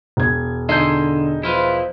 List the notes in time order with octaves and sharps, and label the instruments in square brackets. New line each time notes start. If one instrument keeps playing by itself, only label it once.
[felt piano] E1 G#6
[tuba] D3 [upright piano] D#4 G6 [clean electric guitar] A4 G#5 C6
[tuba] F3 [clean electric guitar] E4 F4 B4